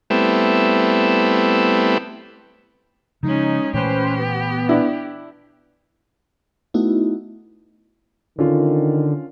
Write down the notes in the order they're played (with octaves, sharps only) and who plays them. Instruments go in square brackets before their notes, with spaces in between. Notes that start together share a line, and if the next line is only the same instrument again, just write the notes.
[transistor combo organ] G3 A3 B3 C4 E4
[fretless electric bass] C#3 F3 [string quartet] G#3 C#4 [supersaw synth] D#4
[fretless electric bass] A#2 E3 A3 [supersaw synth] C#4 B4 C5 [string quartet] G4
[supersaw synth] B3
[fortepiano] D4 E4
[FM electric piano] A3 B3 D#4 E4 F#4
[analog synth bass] D3 [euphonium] D#3 [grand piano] C#4 F4